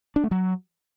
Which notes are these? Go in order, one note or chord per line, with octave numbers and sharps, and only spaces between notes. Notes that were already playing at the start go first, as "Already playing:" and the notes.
D4
A3
F#3